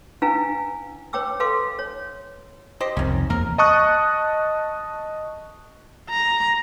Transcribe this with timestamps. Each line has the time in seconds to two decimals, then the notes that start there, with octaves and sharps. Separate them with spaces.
0.22 C#4 D4 E4 B4 F5 G#5
1.13 B4 C#5 G5 D6 E6
1.40 A4 B4 F5 C6 D6
1.79 C#5
2.80 G4 C5 D#5
2.97 C2 F2 D#3 C#4
3.30 E2 A#3 A#4
3.58 D#5 A5 C#6 D#6 F#6
6.10 A#5